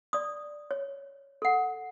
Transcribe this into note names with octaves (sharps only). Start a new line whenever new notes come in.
D5 D#6
C#5
A4 F#5